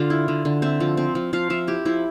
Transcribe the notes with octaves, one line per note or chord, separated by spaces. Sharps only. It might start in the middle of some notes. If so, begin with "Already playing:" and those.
Already playing: D3 F4
E4
D3
D3
C4 E5
F3
C4
F3
F3 F5
F3 E5
E4 G4
F3 E4